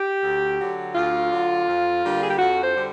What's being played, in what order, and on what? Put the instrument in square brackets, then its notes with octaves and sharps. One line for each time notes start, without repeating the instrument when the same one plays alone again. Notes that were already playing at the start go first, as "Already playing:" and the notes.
Already playing: [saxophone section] G4
D2
D3 F#3
D2 F4
D3 F#3
F2
D3 G3 A#3
G#4
G4
F2 F#4
C5
D3 G3